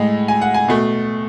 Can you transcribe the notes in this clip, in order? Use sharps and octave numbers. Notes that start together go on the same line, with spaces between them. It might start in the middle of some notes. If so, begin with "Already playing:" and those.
Already playing: A2 G#3
G#5
F#5
G#5
B2 A3